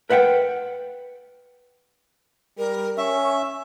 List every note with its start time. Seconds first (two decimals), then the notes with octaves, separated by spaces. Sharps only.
0.10 A#4 B4 E5 F#5 G5
2.58 G3 A#4
2.98 C#4 E5 C#6